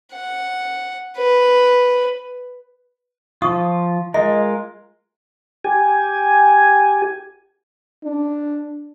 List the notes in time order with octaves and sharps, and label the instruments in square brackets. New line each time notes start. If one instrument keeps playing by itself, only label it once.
[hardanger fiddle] F#5
B4
[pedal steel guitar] F3 F4 [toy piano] C#6 D#6
[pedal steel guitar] G#3 F4 A#4 [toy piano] D#5
[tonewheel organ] G4 G#5
[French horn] D4